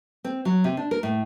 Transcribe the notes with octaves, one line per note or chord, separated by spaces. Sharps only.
C4
F#3
C3
D4
A#4
A2